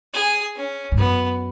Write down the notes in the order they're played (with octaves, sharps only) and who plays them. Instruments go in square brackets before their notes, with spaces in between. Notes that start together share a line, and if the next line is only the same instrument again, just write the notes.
[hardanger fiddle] G#4
C#4
[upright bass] G#2
[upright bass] F#2 [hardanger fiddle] B3